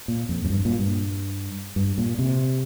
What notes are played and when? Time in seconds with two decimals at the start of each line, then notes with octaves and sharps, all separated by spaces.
0.08 A#2
0.29 F2
0.45 F2
0.50 G2
0.65 A#2
0.79 G2
1.76 G2
1.98 A#2
2.19 C3